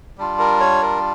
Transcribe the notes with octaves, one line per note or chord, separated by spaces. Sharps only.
G3 D4 F4
A#4
C#5
A#4